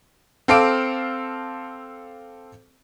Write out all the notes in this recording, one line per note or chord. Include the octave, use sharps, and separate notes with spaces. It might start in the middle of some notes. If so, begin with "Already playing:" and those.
C4 A4 F5 D6 D7